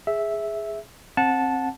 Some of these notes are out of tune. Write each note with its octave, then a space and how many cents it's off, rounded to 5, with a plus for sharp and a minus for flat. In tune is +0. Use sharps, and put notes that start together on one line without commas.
G#4 +0 E5 -5
C4 +20 F#5 -20 A5 -10